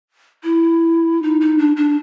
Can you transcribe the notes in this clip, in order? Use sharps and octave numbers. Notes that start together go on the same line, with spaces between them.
E4
D#4
D#4
D4
D4